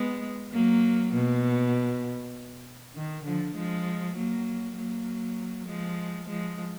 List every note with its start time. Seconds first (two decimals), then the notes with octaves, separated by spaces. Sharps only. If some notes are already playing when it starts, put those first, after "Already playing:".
Already playing: G#3 B3
0.53 F#3 A#3
1.14 B2
2.95 D#3
3.25 D3 F3
3.56 F3 G#3
4.16 F#3 A#3
4.77 F#3 A#3
5.68 F3 G#3
6.28 F3 G#3